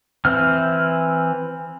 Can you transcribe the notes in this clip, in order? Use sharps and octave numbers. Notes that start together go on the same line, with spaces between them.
E3 C4 F6